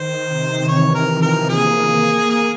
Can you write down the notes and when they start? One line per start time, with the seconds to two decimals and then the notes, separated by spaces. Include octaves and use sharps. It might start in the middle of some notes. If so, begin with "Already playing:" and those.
Already playing: D#3 C5
0.27 C3
0.68 E3 C#5
0.95 A#4
1.08 F3
1.22 A#4
1.49 A#3 G#4
2.30 G#4